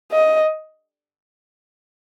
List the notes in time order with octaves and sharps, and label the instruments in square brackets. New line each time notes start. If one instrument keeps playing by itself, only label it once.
[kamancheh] D#5